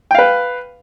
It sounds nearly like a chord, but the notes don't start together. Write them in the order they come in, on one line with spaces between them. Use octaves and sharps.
G5 F5 B4